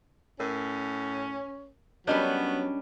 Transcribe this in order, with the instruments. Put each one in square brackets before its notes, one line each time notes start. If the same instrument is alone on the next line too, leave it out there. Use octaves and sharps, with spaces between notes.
[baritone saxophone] A2 [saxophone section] C#4 [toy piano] A#4
[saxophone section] F#3 [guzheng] G3 C#4 D4 [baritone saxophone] B3 [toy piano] A#4 C#5 D#5